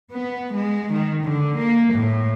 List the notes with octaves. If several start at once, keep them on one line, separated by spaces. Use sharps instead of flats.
B3
G#3
D#3
D3
A#3
A2